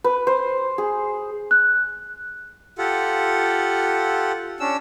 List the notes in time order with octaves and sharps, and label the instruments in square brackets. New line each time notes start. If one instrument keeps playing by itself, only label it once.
[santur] B4
C5
G#4
[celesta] F#6
[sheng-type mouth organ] F4 G4 A4 F#5
C#4 D4 E6